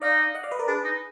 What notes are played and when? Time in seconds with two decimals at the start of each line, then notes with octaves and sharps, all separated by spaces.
0.02 D#4 D5 F5
0.35 D#5 F#5
0.43 D5 F5
0.51 B4 D#5
0.59 A#4 D5
0.68 D4 G#4 B4
0.85 D#4